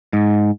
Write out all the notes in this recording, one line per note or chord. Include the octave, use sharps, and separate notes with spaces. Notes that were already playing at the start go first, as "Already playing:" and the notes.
G#2